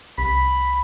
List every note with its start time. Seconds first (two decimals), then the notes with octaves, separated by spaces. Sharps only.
0.18 C2 B5